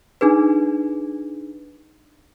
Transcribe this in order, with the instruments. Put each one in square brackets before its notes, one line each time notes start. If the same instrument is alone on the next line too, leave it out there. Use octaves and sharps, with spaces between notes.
[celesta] D4 D#4 G#4 B4